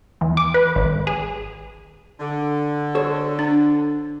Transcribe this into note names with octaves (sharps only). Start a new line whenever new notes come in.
E2
D6
B4
G#1
G#4
D3
A4 C5 C#5
D4